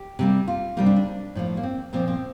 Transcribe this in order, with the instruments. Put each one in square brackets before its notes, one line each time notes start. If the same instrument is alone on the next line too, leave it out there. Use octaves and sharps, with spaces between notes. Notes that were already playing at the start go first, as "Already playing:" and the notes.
Already playing: [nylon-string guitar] G4
C3 G3 A#3
F4
C3 G3 A#3 D#4
D4
D4
A2 F3 A#3
A#3
C4
A#2 F3 A#3 C4
C4